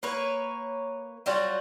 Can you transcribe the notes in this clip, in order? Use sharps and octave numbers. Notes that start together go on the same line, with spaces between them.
A#3 B4 C#5
F#3 G3 F4 F#4